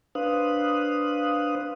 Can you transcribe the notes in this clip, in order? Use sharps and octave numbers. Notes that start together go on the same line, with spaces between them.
D4 B4 C5 F5 D#6 F#6